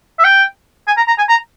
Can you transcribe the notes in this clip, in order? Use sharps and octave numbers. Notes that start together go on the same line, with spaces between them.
E5
G5
G#5
A#5
A#5
G#5
A#5